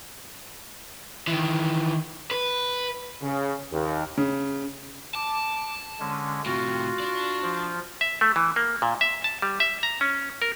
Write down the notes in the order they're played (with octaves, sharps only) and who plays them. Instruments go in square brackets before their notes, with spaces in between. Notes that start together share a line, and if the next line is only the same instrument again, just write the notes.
[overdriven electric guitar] D#3 E3
B4
[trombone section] C#3
D#2
[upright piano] C#3
[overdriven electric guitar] A5 [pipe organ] D6
[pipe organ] D3 G#3 C#4
[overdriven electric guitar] A2 C3 [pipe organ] F4 [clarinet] F#4
[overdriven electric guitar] D4 D5
[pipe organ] F3 F4
[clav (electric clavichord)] E5
A3
E3
A#3
A#2
E5
A5
G3
E5
A#5
C#4
A#4